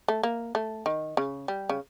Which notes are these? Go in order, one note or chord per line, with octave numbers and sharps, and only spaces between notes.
A3
A#3
A3
D#3
C#3
G3
C#3